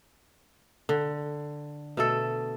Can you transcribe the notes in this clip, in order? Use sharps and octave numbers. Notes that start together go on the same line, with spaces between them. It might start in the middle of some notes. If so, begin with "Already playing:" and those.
D3
B2 A3 A4